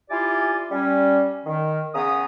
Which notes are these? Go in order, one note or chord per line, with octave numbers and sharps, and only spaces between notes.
E4 F4 G4 D5 G#5
G3 C#4
D#3
C#3 B3 A#5 D#6